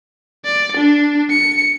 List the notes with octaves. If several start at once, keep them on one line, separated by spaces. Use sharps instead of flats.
D5
D4
C#7